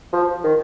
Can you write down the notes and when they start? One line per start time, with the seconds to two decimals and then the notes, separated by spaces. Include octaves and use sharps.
0.13 F3
0.44 D#3